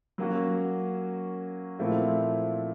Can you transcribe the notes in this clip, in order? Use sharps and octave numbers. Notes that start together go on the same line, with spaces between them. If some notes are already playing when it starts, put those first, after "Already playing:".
F#3 A#3 C#4 F#4
A#2 F3 A3 C4 E4